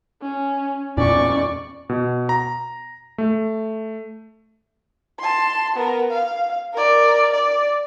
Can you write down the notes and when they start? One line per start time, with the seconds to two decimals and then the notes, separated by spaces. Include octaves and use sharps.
0.22 C#4
0.97 E2 A#2 C#4 D5 C#6
1.89 B2
2.29 A#5
3.18 A3
5.19 A5 C6
5.76 B3 A#4
6.11 F5
6.73 A#4 D5
7.33 D5